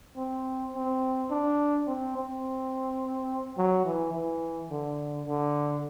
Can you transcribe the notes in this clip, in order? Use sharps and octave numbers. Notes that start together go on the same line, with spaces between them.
C4
C4
D4
C4
C4
F#3
E3
E3
D3
D3